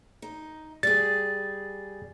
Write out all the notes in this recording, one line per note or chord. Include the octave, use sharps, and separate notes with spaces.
D#4
G3 G#4 A6